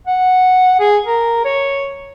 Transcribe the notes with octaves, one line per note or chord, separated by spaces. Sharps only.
F#5
G#4
A#4
C#5